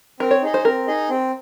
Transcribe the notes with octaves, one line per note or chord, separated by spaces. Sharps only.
C4 A#4
C#5
D#4 G#4 D#5
C5
C4 A#4
D#4 G#4 D#5
C4